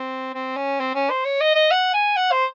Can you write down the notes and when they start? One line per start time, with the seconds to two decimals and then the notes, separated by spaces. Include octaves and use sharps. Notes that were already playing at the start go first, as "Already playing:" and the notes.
Already playing: C4
0.34 C4
0.57 C#4
0.80 C4
0.95 C#4
1.10 C5
1.25 C#5
1.41 D#5
1.55 D#5
1.71 F#5
1.94 G#5
2.16 F#5
2.32 C5